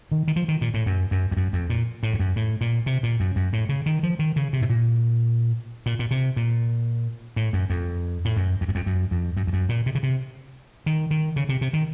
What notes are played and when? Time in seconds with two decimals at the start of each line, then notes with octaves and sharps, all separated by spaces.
0.11 D#3
0.28 D#3
0.36 F3
0.48 D#3
0.61 A#2
0.74 A2
0.86 F#2
1.11 F#2
1.31 F2
1.37 F#2
1.53 F2
1.70 A#2
2.03 A2
2.13 F2
2.20 F#2
2.36 A2
2.61 A#2
2.86 C3
3.03 A#2
3.20 F#2
3.36 F#2
3.53 A2
3.69 C#3
3.86 D#3
4.03 F3
4.19 D#3
4.36 C#3
4.53 C3
4.62 A2
4.70 A#2
5.86 A#2
5.99 A#2
6.11 C3
6.37 A#2
7.36 A2
7.53 F#2
7.70 F2
8.25 A2
8.37 F#2
8.61 F2
8.68 F#2
8.75 F2
8.86 F#2
9.11 F2
9.37 F#2
9.47 F2
9.53 F#2
9.69 A#2
9.86 C3
9.95 C#3
10.03 C3
10.86 D#3
11.11 D#3
11.36 C#3
11.49 C3
11.61 C3
11.73 D#3